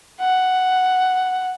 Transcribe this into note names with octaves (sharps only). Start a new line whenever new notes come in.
F#5